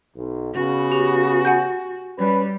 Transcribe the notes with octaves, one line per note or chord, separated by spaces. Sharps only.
B1
C#3 B3 F#4
G4
F#5 G#5 G6
G3 C#4 B4